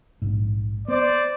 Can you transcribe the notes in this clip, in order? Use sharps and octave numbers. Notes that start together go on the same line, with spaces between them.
A#1 G#2
B3 C5 D5